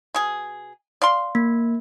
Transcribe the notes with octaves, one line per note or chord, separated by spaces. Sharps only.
B2 G#4
D5 F5 C6
A#3